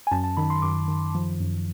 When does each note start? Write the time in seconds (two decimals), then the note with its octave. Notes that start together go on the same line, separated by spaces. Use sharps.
0.07 G#5
0.11 F#2 A5
0.24 A5
0.37 D#3 B5
0.50 C6
0.62 F#2 D6
0.88 D#3
1.15 F3
1.40 F#2